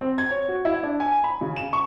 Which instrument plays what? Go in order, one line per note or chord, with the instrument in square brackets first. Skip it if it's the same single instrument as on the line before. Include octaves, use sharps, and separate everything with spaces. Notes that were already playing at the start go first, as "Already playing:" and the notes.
[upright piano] C4
G#6
C#5
F#4
E4
D4
G#5
B5
C#3
E7
C#6